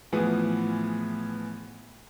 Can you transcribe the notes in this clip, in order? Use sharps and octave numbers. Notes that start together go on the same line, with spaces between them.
A2 E3 F3 B3 G#4